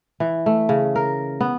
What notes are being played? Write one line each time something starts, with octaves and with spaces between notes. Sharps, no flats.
E3
A3
C#3
A#4
B3